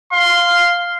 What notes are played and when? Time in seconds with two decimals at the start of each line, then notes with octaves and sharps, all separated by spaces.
0.13 F5 C6